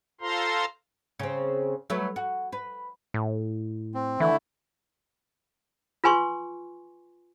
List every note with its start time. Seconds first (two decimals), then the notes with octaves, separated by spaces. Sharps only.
0.21 F4 A4 C5 F5 A#5 C6
1.19 C#3 C4
1.90 F#3 A3 B4
2.16 F#4
2.52 B4
3.14 A2
3.94 C4
4.20 D3 E3 A3 E4
6.04 F4 B4 G#5 C6 C#6